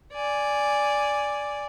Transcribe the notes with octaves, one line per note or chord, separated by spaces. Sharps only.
D5 G#5